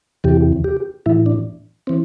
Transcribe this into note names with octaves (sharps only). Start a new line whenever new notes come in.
E2 C3 E3 G4
G4
A2 E3 E4
D4
E3 C4